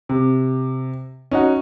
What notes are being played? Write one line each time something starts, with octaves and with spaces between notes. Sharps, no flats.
C3
C#4 D#4 F#4